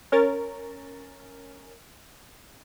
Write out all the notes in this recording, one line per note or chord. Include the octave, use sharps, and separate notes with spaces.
C#4 A#4 A6